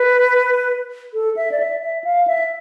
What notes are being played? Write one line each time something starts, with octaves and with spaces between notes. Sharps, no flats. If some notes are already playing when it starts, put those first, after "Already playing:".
Already playing: B4
A4
E5
D5
E5
E5
F5
E5